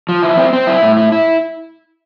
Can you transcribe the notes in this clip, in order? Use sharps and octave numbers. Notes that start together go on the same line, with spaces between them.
F3
E4
C4
C4
E4
A2
E4
E4